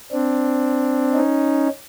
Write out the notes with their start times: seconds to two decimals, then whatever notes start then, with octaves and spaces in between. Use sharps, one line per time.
0.12 C4 D4
1.14 C#4 D#4